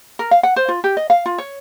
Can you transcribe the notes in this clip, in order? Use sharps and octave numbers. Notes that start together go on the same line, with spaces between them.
A#4
F5
F#5
C5
F4
G4
D#5
F5
F4
C#5